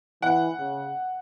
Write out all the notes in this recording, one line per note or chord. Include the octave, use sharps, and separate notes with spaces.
E3 F#5
C#3